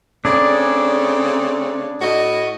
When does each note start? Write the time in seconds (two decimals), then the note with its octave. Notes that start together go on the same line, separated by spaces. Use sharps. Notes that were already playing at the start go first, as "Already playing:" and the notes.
0.25 C#3 A3 C4 D4 G#4 D5
2.00 A2 F#4 D#5